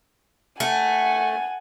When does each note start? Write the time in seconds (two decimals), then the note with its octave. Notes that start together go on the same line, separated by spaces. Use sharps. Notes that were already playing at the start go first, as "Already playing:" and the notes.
0.60 A3 F#5 G#5